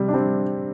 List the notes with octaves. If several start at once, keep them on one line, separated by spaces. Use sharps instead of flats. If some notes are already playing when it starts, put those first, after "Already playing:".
Already playing: C3 G3
D4
G3 C4